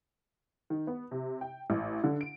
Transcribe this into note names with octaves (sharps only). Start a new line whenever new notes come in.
D#3
B3
C3
G5
A1
D3
D7